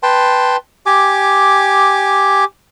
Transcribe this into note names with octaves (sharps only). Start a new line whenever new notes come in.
B4 G5 A5 C6
G4 G#5 D6